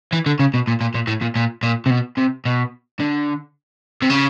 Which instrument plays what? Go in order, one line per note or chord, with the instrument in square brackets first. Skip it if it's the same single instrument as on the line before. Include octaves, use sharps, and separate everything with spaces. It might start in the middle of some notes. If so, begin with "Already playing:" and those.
[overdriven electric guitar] E3
D3
C#3
B2
A#2
A#2
A#2
A2
A#2
A#2
A#2
C3
B2
C3
B2
D3
C3
C#3